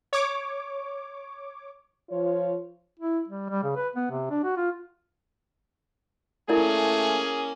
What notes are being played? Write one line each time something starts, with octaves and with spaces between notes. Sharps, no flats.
C#5 D6
F3 F4 C#5
E4
G3
G3
C#3
B4
B3
C3
D4
F#4
F4
A3 A#3 C#4 E4 G#4 A#4 D5